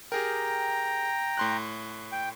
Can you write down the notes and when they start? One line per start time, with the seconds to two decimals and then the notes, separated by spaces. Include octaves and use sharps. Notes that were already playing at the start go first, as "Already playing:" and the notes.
0.12 G4 G#4 A#4 G5 A#5
1.37 A2 C6 F#6
2.12 G5